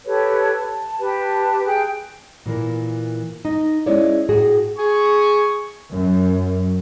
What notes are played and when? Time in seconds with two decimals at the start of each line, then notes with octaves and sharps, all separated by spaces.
0.06 G4 A4 B4 C#5
0.55 A5
0.99 G4 B4 A5
1.66 G#4 G5 F#6
2.46 A#2 E3 A#3
3.45 D#4
3.86 G#3 C#4 E4 C#5 D5
4.29 A2 F#4 G#4
4.78 G#4 C#6
5.92 F#2